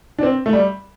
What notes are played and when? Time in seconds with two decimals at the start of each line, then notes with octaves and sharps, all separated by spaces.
0.19 D4
0.23 C4
0.46 A3
0.53 G3